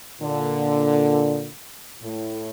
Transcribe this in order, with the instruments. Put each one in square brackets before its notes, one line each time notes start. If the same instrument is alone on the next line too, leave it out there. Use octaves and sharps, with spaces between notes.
[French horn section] A#2 D3
A2